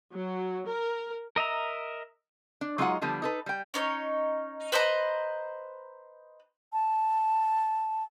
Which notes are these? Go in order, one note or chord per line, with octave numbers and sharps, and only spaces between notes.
F#3
A#4
A#4 D#5 E5 A#5
D4
F#3 G#3 D#4 F4 C#5 F#5
D3 F3 G3 B3 D4
D#4 A4 B4
G3 G5
C#4 D#4 C#5
B4 C5 D#5 A#5
A5